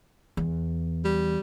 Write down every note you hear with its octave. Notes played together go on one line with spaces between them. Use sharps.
E2
G3